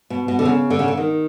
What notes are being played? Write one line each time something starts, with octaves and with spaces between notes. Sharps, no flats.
B2
B2
D3
C#3
D3
C#3
D3
D#3